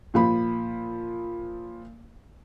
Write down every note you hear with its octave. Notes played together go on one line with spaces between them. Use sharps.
A#2 F3 B5